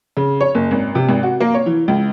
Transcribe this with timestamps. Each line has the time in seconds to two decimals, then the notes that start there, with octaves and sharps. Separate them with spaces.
0.17 C#3
0.41 C#5
0.55 F#1
0.71 G#1
0.95 C3
1.09 G#1
1.23 F#4
1.40 A#3
1.54 C#5
1.66 E3
1.88 C#2